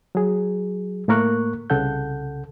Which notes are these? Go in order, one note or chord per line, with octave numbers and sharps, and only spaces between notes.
F#3 G#4
A2 A3 A#3 A#4 C#6 F#6
C2 C#3 A4 F#5 G6